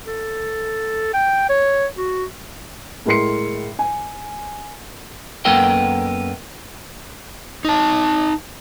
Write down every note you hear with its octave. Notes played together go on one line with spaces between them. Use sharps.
A4
G5
C#5
F#4
A2 G#3 A#4 C6 C7 C#7
G#5
F#2 A#3 B3 A4 A#4 G5
D#4 A5